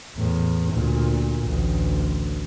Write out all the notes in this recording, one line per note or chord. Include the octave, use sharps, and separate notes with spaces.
E2 A2
D2 A#2
A1 D2